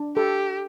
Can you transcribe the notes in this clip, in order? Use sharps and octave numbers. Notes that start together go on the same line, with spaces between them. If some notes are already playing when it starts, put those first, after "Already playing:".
Already playing: D4
G4 A4